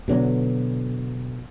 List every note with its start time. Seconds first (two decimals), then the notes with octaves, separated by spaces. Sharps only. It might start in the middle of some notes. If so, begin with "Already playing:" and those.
0.08 B2 D3 F#3